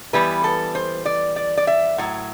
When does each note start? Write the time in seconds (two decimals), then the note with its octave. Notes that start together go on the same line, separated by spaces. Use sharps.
0.13 E3 G3 B3 B4
0.44 A4
0.75 C5
1.06 D5
1.36 D5
1.57 D5
1.67 E5
1.98 A2 F#3